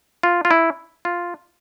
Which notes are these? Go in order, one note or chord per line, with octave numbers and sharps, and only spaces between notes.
F4
F4
E4
F4